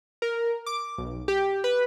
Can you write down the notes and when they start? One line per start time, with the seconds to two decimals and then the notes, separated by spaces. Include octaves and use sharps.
0.22 A#4
0.66 D6
0.98 B1
1.28 G4
1.64 B4